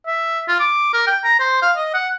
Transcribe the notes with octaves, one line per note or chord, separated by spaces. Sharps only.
E5
F4
D6
A#4
G5
A#5
C5
F5
D#5
F#5